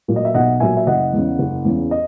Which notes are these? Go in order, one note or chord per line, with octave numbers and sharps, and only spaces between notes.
A#2 F#3
D#5
E5
B1 D#5 F#5
A#2 F#3 E5 G#5
E5
F#1 D#5 F#5
E2 C#3
F#1
E2 C#3
D#5